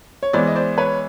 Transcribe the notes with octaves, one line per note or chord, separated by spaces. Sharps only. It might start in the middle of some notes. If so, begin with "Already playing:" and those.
C#5
E3 G#3 B3 C5 D5
D#5
C5 D5
B4 C#5